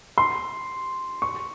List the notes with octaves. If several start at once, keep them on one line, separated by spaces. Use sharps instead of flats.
C6
C#6